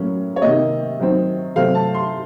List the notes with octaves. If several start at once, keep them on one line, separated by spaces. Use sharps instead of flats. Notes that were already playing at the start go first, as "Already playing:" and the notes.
Already playing: A2 F#3 A#3 C#4
C#5
C3 D#3 A#3 D#5
D#3 F#3 C4
C3 F#3 A3 C4 F5
A5
C6